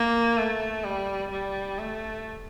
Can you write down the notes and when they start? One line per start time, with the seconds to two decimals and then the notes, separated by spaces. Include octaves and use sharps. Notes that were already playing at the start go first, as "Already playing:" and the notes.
Already playing: A#3
0.37 A3
0.84 G3
1.31 G3
1.79 A3